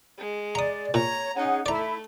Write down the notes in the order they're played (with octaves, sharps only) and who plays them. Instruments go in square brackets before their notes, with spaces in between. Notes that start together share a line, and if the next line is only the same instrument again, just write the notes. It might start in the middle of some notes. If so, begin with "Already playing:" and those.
[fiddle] G#3
[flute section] D5 [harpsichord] A#5 D#6
[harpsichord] A#2 [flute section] C#5 [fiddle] A#5
[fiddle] C#4 D#4 [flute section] G#4 C#5 F#5
[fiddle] A3 [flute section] E4 [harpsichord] D5 A#5